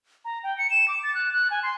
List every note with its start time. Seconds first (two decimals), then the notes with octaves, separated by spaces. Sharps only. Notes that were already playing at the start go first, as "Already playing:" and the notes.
0.25 A#5
0.44 G5
0.58 C#7
0.70 E7
0.88 D6
1.03 A6
1.15 F#6
1.33 F#6
1.51 G#5
1.63 C6